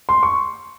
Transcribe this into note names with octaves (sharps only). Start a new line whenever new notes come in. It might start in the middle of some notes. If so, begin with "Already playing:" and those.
C6
C#6